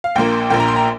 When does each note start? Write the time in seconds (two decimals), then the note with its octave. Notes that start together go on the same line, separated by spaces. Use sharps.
0.04 F5
0.15 A#1 A#2 A#3 G5
0.50 A#1 A#2 A#3 G5
0.60 A#5
0.68 C6
0.76 A#5